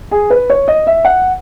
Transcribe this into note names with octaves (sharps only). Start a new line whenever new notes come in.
G#4
B4
C#5
D#5
E5
F#5